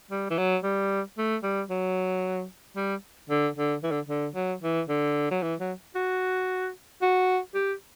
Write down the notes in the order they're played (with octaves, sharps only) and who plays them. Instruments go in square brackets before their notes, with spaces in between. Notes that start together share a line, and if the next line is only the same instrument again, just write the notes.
[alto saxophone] G3
E3
F#3
G3
A3
G3
F#3
G3
D3
D3
E3
D3
D3
F#3
E3
D3
F#3
E3
F#3
F#4
F#4
G4